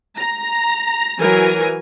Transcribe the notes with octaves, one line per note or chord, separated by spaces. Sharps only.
A#5
E3 F#3 A#4 G#5